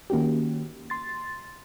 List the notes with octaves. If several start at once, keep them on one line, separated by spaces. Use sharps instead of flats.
D#3 A#3 C#4 F#4 G4
C6 A6